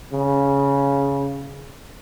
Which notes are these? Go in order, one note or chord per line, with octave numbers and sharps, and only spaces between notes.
C#3